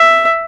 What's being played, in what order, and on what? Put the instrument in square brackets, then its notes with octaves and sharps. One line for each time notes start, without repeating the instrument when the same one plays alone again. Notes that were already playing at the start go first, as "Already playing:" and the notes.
Already playing: [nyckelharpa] E5